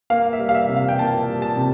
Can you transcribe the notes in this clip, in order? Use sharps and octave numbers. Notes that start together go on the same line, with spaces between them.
A#3 F5
E5
G3
F5
E5
C3
F5
G5
A#3 A5
G3
A5
C3